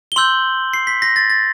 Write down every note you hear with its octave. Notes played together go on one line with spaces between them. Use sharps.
G7
C6 E6 G6 F#7
C7
B6
A#6
A6
A6